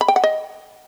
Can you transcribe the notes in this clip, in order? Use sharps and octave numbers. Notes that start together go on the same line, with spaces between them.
B5
G5
F#5
D#5